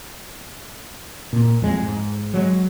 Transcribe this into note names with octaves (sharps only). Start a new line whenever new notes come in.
A#2
F2 G#3
G#2
F#3 G#3